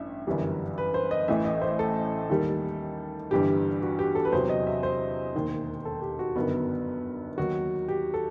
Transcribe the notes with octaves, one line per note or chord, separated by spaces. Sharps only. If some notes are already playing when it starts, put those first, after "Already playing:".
Already playing: A1 G2 E5
G1 F#2 E3 G3
B4
C5
D#5
A1 A2 E3 E5
D#5
C5
A4
D#2 D#3 G3
G1 G2 E3 G3 G4
F#4
G4
A4
B4
E2 C3 F#3 C5
D#5
E5
C5
E1 D#2 D#3
A4
G4
F#4
G1 F#2 D#3 B3
D#2 D#3 F#3 F#4
G4
A4